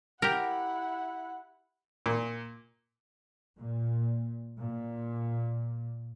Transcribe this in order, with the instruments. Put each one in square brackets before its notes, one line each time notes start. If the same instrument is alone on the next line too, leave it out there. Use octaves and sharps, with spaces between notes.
[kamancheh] E4 F#5 [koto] G4 A#4
[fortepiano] A#2
[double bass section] A#2
A#2